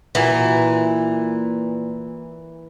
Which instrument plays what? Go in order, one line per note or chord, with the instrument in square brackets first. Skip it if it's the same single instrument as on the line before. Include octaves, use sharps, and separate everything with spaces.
[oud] A#2 F#4 [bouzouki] E3